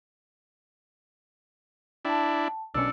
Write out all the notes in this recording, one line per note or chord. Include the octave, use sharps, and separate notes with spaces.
D4 E4 G5 A5
B1 B2 C#4 D4 E6 C#7